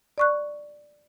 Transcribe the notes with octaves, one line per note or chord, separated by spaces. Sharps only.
D5 C#6 F#6